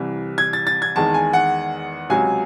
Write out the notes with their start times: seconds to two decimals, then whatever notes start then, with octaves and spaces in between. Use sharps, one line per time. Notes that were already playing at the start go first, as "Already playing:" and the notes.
Already playing: C2 C3 E3
0.38 G#6
0.53 A6
0.67 A6
0.82 G#6
0.96 E2 D#3 G#3 A5
1.14 G#5
1.33 F#5
2.10 C#2 C3 F#3 G#5